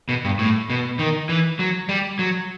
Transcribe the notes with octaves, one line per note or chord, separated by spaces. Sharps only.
B2
G2
A2
B2
D#3
E3
F#3
G3
F#3